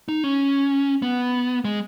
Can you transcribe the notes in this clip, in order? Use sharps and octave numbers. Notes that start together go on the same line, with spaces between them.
D#4
C#4
B3
G#3